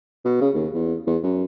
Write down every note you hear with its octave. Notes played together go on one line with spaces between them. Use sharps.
B2
C#3
D#2
E2
E2
F#2